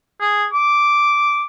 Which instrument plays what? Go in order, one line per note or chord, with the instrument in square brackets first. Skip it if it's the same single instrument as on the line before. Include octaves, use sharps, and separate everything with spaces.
[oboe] G#4
D6